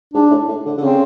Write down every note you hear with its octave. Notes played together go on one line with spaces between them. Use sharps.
G#2 D4
A2
A2
D3
D3
C#3 C4